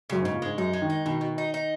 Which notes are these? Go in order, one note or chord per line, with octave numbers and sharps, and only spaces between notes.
F#2 C#3
G#2 C#3
A#2
G#2 G#3
F#2 D#4
G#3
D#3
D#4
B2 D#3
B2
D#4
D#4